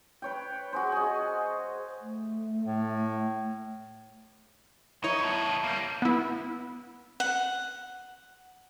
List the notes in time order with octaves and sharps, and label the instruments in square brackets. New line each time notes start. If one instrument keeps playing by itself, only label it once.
[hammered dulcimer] B4 C#5 G5
F#4 G#4 C5
G#4 D#5
[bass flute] A3
[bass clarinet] A2
[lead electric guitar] D#4 [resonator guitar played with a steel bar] E4 C#5
[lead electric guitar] B3 A4
G3 A#3
[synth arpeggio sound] B3 E4
[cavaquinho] F#5